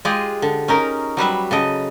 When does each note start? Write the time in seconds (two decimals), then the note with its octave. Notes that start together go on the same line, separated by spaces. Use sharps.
0.05 G#3 F4 G4 G#4 D#5
0.42 D3
0.68 C#4 D#4 A#4
1.17 F#3 G3 B4 E5
1.51 C#3 A4 D#5